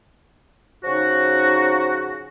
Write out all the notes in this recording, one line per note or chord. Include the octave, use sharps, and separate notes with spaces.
C#3 F3 D#4 F#4